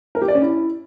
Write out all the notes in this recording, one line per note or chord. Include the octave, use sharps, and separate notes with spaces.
A#4
G4
D5
C#4
E4